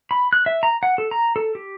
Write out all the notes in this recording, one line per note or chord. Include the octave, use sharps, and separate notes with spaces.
B5
F#6
E5
A#5
F#5
A4
A#5
A4
G4